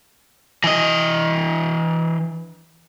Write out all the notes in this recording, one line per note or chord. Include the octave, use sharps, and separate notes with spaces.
E3 D#5